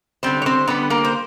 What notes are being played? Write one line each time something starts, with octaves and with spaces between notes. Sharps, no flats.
D3 G3 C4 C5
C#5
C4 C5
D3 G3 B3 B4
A#3 A#4
C5